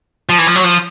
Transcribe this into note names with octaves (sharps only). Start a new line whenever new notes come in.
F3
E3
F3
F#3
F3